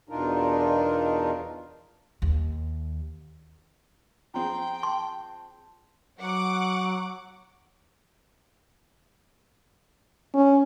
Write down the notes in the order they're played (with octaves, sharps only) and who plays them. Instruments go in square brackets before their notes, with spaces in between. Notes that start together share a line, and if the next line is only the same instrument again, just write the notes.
[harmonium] E2 B2 D4 D#4 F4 A#4
[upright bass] D#2
[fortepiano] F3 C4 G#4 [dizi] G5 [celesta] A#5 C6
[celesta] A5 [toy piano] C6
[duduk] F#3 [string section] F#5 D6
[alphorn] C#4